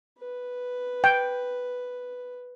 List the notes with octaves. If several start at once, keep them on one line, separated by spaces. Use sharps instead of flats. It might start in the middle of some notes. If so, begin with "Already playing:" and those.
B4
G5